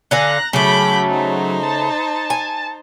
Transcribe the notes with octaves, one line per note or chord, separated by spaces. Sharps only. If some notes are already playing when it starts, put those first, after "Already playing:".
D3 F5 G#5 A#5 F#6
C#3 F#3 A3 B5 D6 G6
D#4 C5
A5
G#5